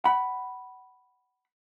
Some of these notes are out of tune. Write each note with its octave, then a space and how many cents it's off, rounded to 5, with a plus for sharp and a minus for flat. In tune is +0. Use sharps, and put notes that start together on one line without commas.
F#5 +25 B5 +0